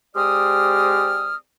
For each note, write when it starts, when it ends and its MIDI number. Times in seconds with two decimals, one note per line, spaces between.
0.16 1.36 56
0.16 1.36 60
0.16 1.36 67
0.16 1.36 74
0.16 1.36 87
0.16 1.36 89